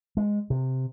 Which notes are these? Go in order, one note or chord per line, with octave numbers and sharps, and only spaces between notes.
G#3
C3